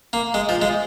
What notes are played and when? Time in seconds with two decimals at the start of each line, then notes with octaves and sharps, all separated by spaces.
0.13 A#3
0.34 G#3
0.49 F3
0.62 G#3